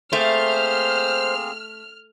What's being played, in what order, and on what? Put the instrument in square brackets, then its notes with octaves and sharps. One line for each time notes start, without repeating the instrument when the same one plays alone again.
[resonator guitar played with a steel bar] A3 [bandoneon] A#3 C4 G#4 [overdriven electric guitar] C5 [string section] F6